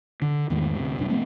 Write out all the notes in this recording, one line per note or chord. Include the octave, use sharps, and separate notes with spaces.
D3
E2 G#2 D#3 A3
D2 C3
F1 B1 G2 D4
F3 A3 B3 C4